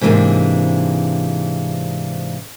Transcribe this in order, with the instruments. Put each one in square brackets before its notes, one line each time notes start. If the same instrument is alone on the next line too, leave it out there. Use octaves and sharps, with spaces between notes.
[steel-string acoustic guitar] G#2 C3 E3 G#3 A#3 D4